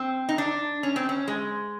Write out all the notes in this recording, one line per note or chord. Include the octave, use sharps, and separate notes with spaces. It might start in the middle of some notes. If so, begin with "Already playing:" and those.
Already playing: C4
D#4
D4
C#4
C4
C#4
G#3